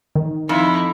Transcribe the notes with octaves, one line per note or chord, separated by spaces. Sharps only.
D#3
F2 D#4 E4